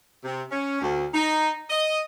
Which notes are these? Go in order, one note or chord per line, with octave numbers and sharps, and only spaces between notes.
C3
C#4
D2
D#4
D#5